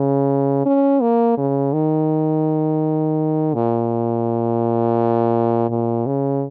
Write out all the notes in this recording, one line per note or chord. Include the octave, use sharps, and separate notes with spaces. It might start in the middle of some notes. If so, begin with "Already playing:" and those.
Already playing: C#3
C#4
A#3
C#3
D#3
A#2
A#2
C#3